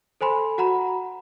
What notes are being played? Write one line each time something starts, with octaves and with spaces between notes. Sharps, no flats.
A4 C5 G#5 B5 C6
F#4 F#5 A#5 B5